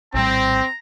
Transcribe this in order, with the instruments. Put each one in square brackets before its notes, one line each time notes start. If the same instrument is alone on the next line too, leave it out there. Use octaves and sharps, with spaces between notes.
[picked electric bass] A#1 A2 G3 [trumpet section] C4 [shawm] A#5